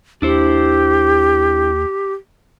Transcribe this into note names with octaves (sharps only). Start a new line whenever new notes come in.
D#2 D4 E4 G4 C5